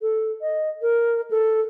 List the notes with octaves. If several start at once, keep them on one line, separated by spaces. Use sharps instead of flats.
A4
D#5
A#4
A4